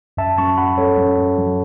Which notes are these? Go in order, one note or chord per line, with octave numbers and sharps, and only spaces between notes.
F#2 E5 A5
F#2 A5 C#6
F#2 F#5 B5
F#2 A4 C#5
F#2
F#2
F#3